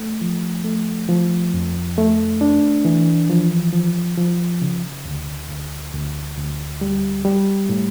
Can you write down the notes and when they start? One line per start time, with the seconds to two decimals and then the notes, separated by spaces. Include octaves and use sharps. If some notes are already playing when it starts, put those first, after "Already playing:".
Already playing: A3
0.21 F3
0.64 A3
1.09 F3
1.54 F2
1.98 A3
2.41 D4
2.85 E3
3.30 F3
3.73 F3
4.17 F3
4.62 C#3
5.05 D2
5.49 D2
5.94 D2
6.38 D2
6.81 G3
7.25 G3
7.69 A2